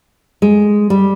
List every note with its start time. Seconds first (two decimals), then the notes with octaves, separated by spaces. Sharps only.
0.42 G#3
0.90 G3